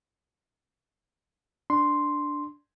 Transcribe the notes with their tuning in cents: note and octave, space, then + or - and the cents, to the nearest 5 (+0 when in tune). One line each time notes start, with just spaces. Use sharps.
D4 +0 C6 +0